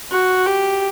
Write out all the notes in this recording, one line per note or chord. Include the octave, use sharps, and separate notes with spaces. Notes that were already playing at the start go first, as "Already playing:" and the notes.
F#4
G4